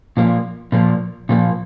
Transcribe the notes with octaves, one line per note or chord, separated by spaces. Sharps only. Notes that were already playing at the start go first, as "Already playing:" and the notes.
A#2 F3 A#3
A#2 F3 A#3
A#2 F3 A#3